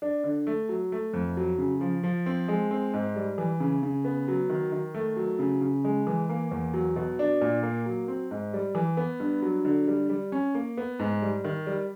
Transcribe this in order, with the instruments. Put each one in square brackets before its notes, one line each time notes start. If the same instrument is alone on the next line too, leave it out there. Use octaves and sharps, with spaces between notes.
[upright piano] D4
D3
A3
F#3
A3
F2
F#3
C#3
F3
F3
C4
G#3
C4
G#2
G3
E3
C#3
C#3
B3
F#3
D#3
D#3
A3
F#3
C#3
C#3
G#3
E3
A#3
E2
F#3
B2
D4
A#2
A#3
F#3
C4
G#2
G3
E3
B3
G2
F#3
D3
G3
G3
C#4
A#3
B3
G#2
G3
D#3
G3